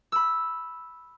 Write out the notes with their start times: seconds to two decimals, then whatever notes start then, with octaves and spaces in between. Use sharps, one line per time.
0.12 B5 E6